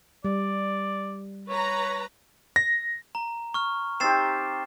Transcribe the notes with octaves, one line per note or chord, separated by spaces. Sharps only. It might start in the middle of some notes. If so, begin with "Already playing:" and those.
G3 D5
B4 C#5 A#5
A#6
A#5
C#6 F6
C4 D#4 G4 A6 C7 E7